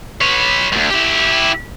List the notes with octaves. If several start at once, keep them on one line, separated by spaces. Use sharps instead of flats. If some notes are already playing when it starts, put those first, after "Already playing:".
B4 C#5
D2 G2
E4 G4